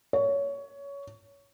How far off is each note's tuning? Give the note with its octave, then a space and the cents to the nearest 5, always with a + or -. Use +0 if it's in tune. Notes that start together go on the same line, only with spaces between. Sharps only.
C#5 +20